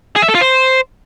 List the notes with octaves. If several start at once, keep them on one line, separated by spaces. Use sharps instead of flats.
G#4
E5
A4
F4
C5